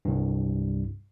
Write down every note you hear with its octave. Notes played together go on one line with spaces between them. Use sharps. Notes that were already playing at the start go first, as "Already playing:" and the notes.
C2 G2